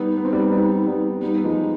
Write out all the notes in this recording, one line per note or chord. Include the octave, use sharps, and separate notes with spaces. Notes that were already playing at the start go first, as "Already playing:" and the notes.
Already playing: G3 B3 D#4
B3
C4
G3 B3
G3 B3
G3 B3
G3 B3 D#4
B3
F3 G#3